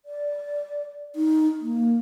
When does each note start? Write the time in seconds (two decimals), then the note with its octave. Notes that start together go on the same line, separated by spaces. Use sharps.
0.05 D5
1.16 D#4
1.61 A#3